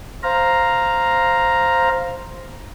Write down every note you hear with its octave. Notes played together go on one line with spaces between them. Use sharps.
C5 F5 A#5